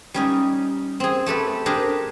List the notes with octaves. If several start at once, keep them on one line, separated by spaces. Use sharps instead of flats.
G3 C#4 D#4
C4 G#4
A3 G4 A4 B4
D4 G4 G#4 A#4 C5